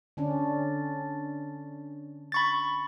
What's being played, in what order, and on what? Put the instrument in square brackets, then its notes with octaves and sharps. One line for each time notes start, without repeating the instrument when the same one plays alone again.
[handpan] D3 C#4 D4
[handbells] B5 C#6 A6